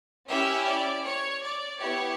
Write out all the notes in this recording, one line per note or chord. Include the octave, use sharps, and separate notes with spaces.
C#4 E4 G4 E5
D5
C#5
D5
B3 E4 G4 C#5